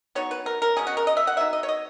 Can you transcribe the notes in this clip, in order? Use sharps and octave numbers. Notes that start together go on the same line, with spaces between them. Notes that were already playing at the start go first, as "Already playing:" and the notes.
F#3 B3 D#4 C#5
B4
A#4
A#4
B2 G#3 C#4 G#4
F#4
A#4
D#5
E5
F#5
F#3 B3 D#4 E5
D#5
C#5
D#5